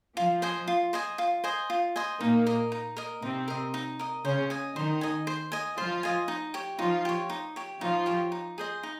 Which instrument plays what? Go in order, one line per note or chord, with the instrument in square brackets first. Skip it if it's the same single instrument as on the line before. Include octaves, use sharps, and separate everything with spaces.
[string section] F3 [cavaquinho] F4
[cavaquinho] C5 D#5 G#5
F4
C5 D#5 G#5
F4
C5 D#5 G#5
F4
C5 D#5 G#5
[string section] A#2 A#3 [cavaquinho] D#4
[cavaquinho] A#4 D#5
D#4
A#4 D#5
[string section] C3 C4 [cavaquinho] D#4
[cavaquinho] A#4 D#5
D#4
A#4 D#5
[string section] C#3 C#4 [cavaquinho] C5
[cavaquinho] D#5 G#5
[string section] D#3 D#4 [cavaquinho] C5
[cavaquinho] D#5 G#5
C5
D#5 G#5
[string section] F3 F4 [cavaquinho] C5
[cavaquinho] D#5 G#5
D#4
G4 C#5
[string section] F3 F4 [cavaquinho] D#4
[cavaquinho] G4 C#5
D#4
G4 C#5
[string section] F3 F4 [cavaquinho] D#4
[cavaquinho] G4 C#5
D#4
G#4 C5 D#5
D#4